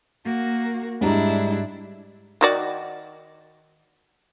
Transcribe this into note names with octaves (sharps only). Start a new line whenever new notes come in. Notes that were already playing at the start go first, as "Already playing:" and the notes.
A#3 F#4 A#4
G#2 G3 D4 E4 A#5
D#3 F#4 D5